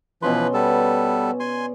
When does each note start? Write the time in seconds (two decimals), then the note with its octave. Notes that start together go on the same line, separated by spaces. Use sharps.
0.22 B2 E3 F3 C#4 B4 C6
0.54 G3 B3 A4
1.40 D5 G#5 C6